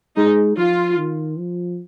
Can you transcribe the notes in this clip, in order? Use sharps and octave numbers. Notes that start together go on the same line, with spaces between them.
G#3 D#4
F3 F4
D#3
F3